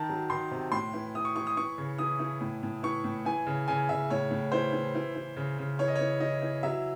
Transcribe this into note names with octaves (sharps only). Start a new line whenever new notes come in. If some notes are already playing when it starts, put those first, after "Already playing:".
Already playing: D#3 A5
F#3
D#3 C6
C3
A2 C6
E3
E3 D#6
C#6
E3 C#6
D#6
E3 C#6
C#3
E3 D#6
E3
A2
A2
E3 C#6
A2
E3 G#5
C#3
C#3 G#5
C#3 E5
A2 C#5
A2
E3 C5
E3
E3
E3
C#3
C#3
E3 C#5
D#5
E3 C#5
E3 D#5
E3
F#3 E5